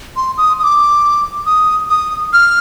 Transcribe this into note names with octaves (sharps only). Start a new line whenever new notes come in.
C6
D#6
D#6
D6
D#6
D#6
F6